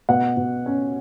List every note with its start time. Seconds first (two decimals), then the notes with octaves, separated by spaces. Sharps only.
0.09 B2 F#5
0.37 B2
0.66 C#4